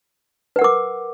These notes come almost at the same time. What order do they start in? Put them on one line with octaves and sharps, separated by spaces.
B4 F#5 A#4 D6